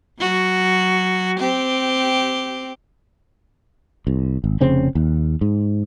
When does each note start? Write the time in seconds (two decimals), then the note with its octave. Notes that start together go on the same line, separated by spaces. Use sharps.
0.19 F#3 F#4
1.40 C4 G4
4.07 C2
4.44 G#1
4.61 F1 C#3 C4 C#4
4.95 D#2
5.41 G#2